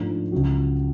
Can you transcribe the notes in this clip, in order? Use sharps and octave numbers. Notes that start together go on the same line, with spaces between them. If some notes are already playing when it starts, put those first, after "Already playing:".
Already playing: G#2 F3 A3 D4
C#2 C#3 F#3